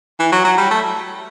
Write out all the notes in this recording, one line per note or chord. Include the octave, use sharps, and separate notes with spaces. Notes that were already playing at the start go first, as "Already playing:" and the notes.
E3
F#3
F#3
G3
A3